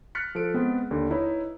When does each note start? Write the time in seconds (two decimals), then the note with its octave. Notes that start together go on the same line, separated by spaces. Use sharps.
0.15 F6 F#6 A6 B6 C#7
0.35 F3 A4 D7
0.54 G#3 B3 C4
0.91 D#2 D3
1.10 D#4 E4 B4 C#5